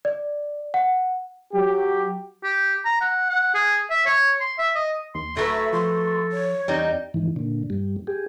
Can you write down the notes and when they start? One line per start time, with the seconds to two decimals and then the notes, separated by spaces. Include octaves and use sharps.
0.05 D5
0.74 F#5
1.53 F#3 G4
2.44 G4
2.85 A#5
3.01 F#5
3.29 F#5
3.54 G#4
3.90 E5
4.06 C#5
4.40 C6
4.58 E5
4.76 D#5
5.15 D#2 C6
5.37 D1 F#3 A3 A4 B4 E5
5.73 F3 C6
6.32 C#5
6.68 E2 G3 C4 D#4
7.14 G#2 D#3 E3
7.36 A#2 D3
7.70 G2 G3
8.07 G4 G#4